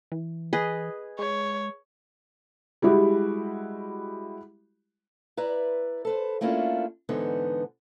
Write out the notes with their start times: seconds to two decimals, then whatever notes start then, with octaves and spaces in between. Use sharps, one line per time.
0.12 E3
0.53 G#4 B4 D#5
1.19 G#3 C#5
2.82 G3 G#3 E4 F#4 G4
5.37 E4 B4 D5 A#5
6.05 A4 B4 C5
6.41 A3 A#3 C#4 D4 E4 F4
7.09 G#2 D3 E3 B3 D#4